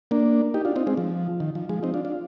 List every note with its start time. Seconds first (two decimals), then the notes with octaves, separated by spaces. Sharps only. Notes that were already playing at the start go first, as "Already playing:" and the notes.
0.11 A#3 D4
0.54 D#4 G4
0.65 D4 F4
0.76 C4 D#4
0.87 G#3 C4
0.97 F3
1.40 D#3
1.55 F3
1.69 F3 G#3
1.83 C4 D#4
1.94 D4 F4
2.05 D4 F4